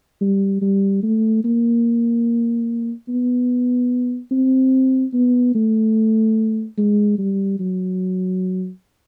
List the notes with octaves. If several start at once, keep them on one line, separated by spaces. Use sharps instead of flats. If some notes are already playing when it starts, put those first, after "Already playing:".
G3
G3
A3
A#3
B3
C4
B3
A3
G#3
G3
F#3